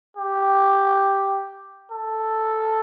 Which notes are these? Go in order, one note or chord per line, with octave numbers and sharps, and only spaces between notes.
G4
A4